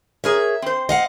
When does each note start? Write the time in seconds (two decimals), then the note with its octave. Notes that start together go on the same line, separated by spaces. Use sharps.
0.24 G#4 A#4 C#5 E5
0.62 C4 C5
0.89 D#5 F5 F#5